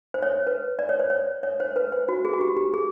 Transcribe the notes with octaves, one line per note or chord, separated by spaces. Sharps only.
C5
C#5
C5
B4
D5
C#5
C5
C#5
C#5
C5
B4
C5
F#4
G#4
F#4
G4
G4
G#4